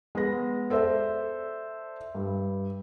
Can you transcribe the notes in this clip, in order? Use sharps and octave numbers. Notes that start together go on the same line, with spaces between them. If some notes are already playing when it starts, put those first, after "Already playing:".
G#3 B3 A#6
A4 C5 D5 E5
G2